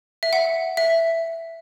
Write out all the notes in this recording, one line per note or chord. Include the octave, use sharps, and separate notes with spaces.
E5
F#5
E5